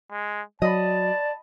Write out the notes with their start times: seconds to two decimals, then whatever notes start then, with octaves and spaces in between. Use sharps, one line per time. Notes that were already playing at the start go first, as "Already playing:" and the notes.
0.12 G#3
0.62 F#3 D5 D#5 A5 B5